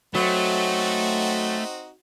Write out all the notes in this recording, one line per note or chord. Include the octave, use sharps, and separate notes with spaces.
F#3 A3 C4 D#4 F#4